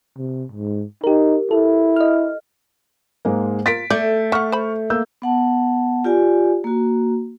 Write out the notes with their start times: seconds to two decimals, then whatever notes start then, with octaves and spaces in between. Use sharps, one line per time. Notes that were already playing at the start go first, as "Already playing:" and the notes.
0.17 C3
0.52 G#2
1.04 D#4 G4 A#4
1.51 E4 A4
1.96 D#5 F6
3.25 G#2 G#3 A#3
3.66 F4 A#4 A6 B6 D7
3.90 A3 D5 G6
4.32 E5 F#5 C#6 F6
4.52 C5 B5
4.90 A#3 E6 G6
5.22 B3 F#5 A5
6.04 F4 G4 D5 G#5
6.64 A#3 F#4